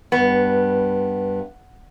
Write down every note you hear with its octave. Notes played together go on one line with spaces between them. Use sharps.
G2 B3